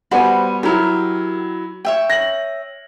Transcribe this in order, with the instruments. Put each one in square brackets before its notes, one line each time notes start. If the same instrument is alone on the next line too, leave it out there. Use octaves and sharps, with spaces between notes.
[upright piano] G3 B3 G#5 [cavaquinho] F#4 C5
[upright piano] F#3 E4 [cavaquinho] G4 A#4
[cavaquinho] C#5 E5 G5
[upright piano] A#6 F#7